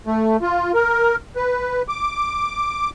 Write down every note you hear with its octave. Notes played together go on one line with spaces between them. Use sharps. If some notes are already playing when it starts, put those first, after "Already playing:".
A3
F4
A#4
B4
D6